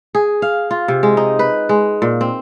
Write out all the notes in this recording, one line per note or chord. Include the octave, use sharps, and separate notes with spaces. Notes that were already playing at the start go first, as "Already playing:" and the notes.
G#4
F5
F4
C3
G#3
D#4
B4
G#3
A#2
C4